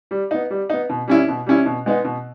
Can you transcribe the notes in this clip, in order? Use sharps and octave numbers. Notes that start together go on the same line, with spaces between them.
G3
B3 D#4
G3
B3 D#4
B2
G3 C#4 E4
B2
G3 C#4 E4
B2
G#3 B3 D#4
B2